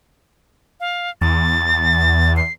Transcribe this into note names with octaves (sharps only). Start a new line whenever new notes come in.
F5
E2 A6
C7